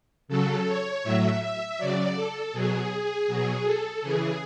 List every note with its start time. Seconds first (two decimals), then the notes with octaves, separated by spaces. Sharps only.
0.28 C#3 F#3 A4
0.66 C#5
1.03 A2 F#3 E5
1.41 E5
1.78 C#3 F#3 D5
2.15 A4
2.53 B2 F#3 G#4
3.28 B2 F#3
3.64 A4
4.01 C#3 E3 G#4